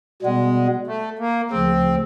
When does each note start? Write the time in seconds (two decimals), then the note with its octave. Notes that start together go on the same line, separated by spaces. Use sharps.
0.22 B2 G3 G#3 B3
0.87 A3
1.19 A#3
1.50 D2 C#3 F3 C4